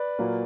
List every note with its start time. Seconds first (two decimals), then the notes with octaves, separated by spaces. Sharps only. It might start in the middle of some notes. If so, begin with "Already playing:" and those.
Already playing: B4 D5
0.18 A#2 F#3 A#3